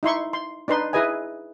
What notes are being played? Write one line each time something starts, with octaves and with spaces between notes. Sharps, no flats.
D#4 E4 C6 C#6
C6
D4 D#4 B4 C6
E4 G#4 B4 D#5 G#5